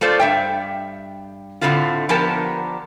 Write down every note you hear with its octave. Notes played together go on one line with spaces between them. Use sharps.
A3 F4 A4 C5 D5
G2 E5 G5
A2 D3 G#3 A3 C4 F4
D3 F3 B3 G4 A#4 A5